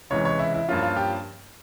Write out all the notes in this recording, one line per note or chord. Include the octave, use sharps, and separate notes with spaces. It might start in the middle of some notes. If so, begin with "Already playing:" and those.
C#2 C3 E3 G#3 C#4 C#5
C#5
E4
E4
G2 F3 A#3 C#4 F4
F4
G4